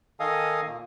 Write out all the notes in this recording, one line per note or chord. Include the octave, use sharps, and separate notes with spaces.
D#3 A4 D#5 F5 G#5 D#6
A#2 A#3